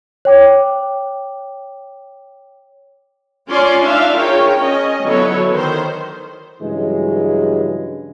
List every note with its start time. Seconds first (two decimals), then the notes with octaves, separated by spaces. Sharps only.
0.25 C#5 G5 D6
3.49 C#4 F4 D5 C6
3.83 D4 D#4 E5 F5
4.15 F4 G#4 A#4 C#5 G5
4.59 C#4 D#5
5.04 D3 F#3 B3 E4 A4 C#5
5.53 D#3 C5
6.61 G2 C#3 E3 F#3 G#3